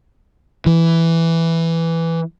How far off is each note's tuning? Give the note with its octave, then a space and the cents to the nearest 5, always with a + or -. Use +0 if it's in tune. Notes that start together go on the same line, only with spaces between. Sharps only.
E3 +5